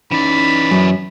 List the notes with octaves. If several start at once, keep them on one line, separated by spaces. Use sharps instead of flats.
E3 C#4 D#4 D5 B5
F#2